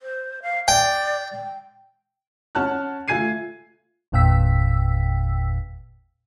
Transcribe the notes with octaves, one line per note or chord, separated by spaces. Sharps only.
C5
F5
D5 G5
G5
C#4 C#5 F#5 A5 F6 F#6
A3 F4 G#5 G#6 C7 D#7
G1 E2 A#2 G5 E6 B6